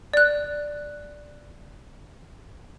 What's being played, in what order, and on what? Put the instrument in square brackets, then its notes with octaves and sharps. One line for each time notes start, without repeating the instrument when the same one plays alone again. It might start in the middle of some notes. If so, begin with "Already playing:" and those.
[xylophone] D5 F#6